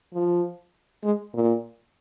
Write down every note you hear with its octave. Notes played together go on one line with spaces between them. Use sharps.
F3
G#3
A#2